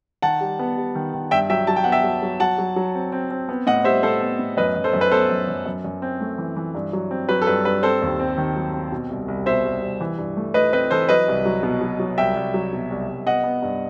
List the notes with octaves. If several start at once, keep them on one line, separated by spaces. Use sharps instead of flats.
D#3 F#5 A5
G3
B3
G3
D#3
D#3
G2 E5 G5
F#3 E5 G5
F#3 A5
G5
B3 F#5
E5 G5
F#3
F#3
F#3 F#5 A5
F#3
F#3
C4
C4
C4
B3
A2 D#5 F#5
G3 C5 E5
A2 A4 C5
B3
A2
F#2 B4 D#5
F#2
A4 C5
F#2
B4
B3 A4 C5
F#2
F#2
F#2
F#2
C4
A3
E3
E3
G2
F#3
C4
F#3 B4
A4
G2 B4
G2 B4
C4 A4 C5
D#2
C4
D#3
F#3
C4
B2
C2
C2
B2 C5 E5
C2
C2
E3
G2
A3
A3 B4 D#5
C4 B4 D#5
E3 A4 C5
F#3 B4 D#5
C2
F#3
B2
F#3
F#3
C2 E5 G5
C2
F#3
B2
C2
C2
B3 D#5 F#5
B3
G2